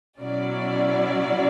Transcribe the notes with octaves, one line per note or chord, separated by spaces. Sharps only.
B2 F#3 C#4 E4 D5